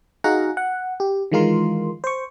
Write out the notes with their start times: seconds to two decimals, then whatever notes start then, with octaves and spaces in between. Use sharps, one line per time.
0.24 D#4 F#4 G#4 F5 F#5 A#5
0.57 F#5
1.00 G4
1.32 D#3 E3 G#3 F4 A#4 C6
2.04 C5 C#6